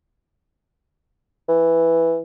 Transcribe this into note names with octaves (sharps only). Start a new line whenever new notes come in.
E3